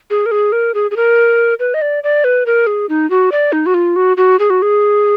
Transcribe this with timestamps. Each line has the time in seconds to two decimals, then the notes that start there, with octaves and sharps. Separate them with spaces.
0.10 G#4
0.26 A#4
0.31 G#4
0.52 A#4
0.74 G#4
0.91 G#4
0.96 A#4
1.59 B4
1.74 D#5
1.82 D5
2.04 D5
2.24 B4
2.46 A#4
2.67 G#4
2.89 D#4
3.10 F#4
3.32 D5
3.52 D#4
3.66 F#4
3.74 F4
3.96 F#4
4.17 F#4
4.39 G#4
4.50 F#4
4.62 G#4